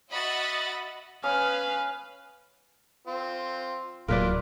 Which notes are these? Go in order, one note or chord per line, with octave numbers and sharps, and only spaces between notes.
F#4 D#5 E5 F#5 B5 A6
C#4 B4 F5 B5 D#6
C4 F4
D1 A#2 F#3 E4 F4 A#4 B4 D5